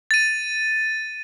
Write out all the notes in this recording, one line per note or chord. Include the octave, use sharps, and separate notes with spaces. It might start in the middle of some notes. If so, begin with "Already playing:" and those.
A6 D#7